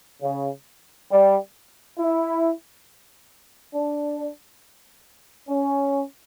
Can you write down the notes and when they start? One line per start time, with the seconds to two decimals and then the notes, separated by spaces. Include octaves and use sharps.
0.22 C#3
1.11 G3
1.98 E4
3.74 D4
5.49 C#4